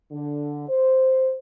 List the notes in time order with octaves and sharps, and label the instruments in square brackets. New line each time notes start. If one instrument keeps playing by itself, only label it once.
[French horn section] D3
C5